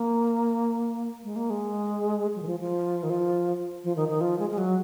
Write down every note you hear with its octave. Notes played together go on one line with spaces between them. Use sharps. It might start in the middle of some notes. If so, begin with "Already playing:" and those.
Already playing: A#3
G#3
A#3
G#3
F#3
D#3
F3
F3
D#3
F3
F3
D#3
D#3
F3
G#3
G#3
F#3